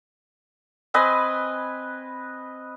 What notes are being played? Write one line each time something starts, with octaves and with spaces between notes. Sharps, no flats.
C4 B4 D#5 G#5